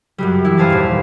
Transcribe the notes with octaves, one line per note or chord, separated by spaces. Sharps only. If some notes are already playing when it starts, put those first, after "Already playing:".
F#2 F#3 G3
E3 E4
B4 C5 F5 G#5 A5
D#2 A#2